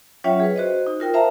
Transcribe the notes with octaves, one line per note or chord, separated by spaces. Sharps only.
F#3 C#4 F4 C#5 E5 G5
G#4 B4
F#4 C5 D#5
D#4
F4 A#4 G5
C5 E5 F5 A5 A#5